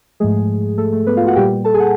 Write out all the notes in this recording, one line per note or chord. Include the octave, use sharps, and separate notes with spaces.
G#2 F3 G#3 A3 G#4
A3 A4
A3 A4
B3 B4
F4 F5
F#4 F#5
A#2 G3 A#3 G4 G5
A4 A5
G#4 G#5
F#5